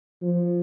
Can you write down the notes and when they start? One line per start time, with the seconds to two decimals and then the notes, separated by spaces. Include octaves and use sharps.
0.22 F3